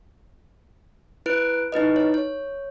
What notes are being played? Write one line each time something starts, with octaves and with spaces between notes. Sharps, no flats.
E4 B4 F#6 D7
D#4 E4 B4 D#5
C#5
C#5